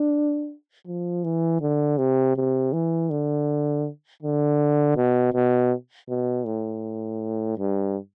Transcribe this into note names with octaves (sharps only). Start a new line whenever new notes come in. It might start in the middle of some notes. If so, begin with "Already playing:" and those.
Already playing: D4
F3
E3
D3
C3
C3
E3
D3
D3
B2
B2
B2
A2
G2